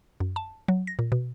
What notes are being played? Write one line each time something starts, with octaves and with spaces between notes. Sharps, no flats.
F#2
A5
F#3
A#6
A#2
B2